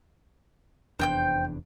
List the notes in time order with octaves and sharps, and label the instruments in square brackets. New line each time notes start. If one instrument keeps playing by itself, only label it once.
[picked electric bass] F1 E2 D4 [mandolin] C5 G5 G6